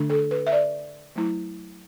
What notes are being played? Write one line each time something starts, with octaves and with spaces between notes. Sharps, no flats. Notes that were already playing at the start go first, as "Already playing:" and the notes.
Already playing: D3 A3 D4
A4
B4
E5
D5
F#3 A3 E4